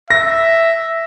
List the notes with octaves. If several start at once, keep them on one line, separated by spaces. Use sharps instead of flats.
E5 A#6